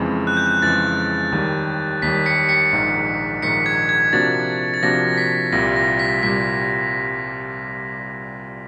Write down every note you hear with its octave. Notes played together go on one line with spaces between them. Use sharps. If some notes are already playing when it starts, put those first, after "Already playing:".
Already playing: F2 C#3 E3 G#3
F#6
G6
F#6
F2 C#3 E3 G#3 A6
D#2 D#3 G3
D#2 D#3 G3 B6
B6 C#7
B6 C#7
A#1 G#2 D#3
A#1 G#2 D#3 B6 C#7
G#6
G#6
C3 F3 A#3 D4 F#4 A6
A6
C3 F3 A#3 D4 F#4 A#6
B6
C2 A#2 G3 A#6
A#6
B6
C2 A#2 G3 B6